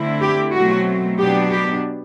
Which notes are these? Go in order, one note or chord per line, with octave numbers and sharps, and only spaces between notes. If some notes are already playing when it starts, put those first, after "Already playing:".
Already playing: D3 A3 C4 E4
G4
B2 F#3 A3 C4 F#4
B2 F#3 B3 D4 G4
G4